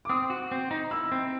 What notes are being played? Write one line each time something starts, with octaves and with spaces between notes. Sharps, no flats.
D6
C4 D#6
F#4
C4
D#4
E4 E6
C4